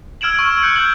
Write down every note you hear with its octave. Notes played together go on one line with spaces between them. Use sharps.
E6 F6 G#6 D7 E7 F#7
C#6
F#6 G6 C#7
G#6 F#7